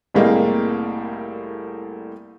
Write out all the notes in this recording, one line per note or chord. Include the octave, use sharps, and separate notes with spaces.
C2 A2 G3 G#3 A#3 C4